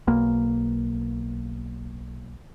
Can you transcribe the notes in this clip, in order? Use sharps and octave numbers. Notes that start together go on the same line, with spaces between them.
B1 A#3